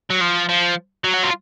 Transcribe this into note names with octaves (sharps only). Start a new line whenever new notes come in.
F#3
F3
F3
F#3
F#4
F4